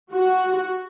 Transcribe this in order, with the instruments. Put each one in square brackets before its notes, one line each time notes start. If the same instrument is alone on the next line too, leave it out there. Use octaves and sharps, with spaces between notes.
[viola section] F#4